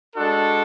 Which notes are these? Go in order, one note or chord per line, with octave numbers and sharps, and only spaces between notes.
G#3 D4 F#4 A4